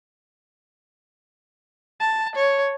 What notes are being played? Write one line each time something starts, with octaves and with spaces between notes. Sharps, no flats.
A5
C#5